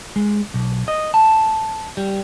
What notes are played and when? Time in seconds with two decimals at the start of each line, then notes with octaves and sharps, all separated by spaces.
0.16 G#3
0.54 B1
0.88 D#5
1.14 A5
1.97 G3